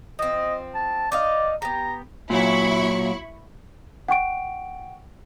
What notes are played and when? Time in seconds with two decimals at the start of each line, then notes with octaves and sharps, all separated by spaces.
0.19 F3 C4 D#5
0.75 A5
1.12 D#4 D5 D#5 F5
1.62 B3 G4 A#5
2.30 A#2 F#3 E4 B5 C#6
4.08 F#5 G5 C#6 D7